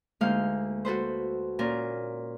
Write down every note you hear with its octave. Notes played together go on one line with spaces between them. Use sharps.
D2 G#3 A#3 D#4 F5 G6
F#4 A4 B4 C5
A#2 C#4 A#4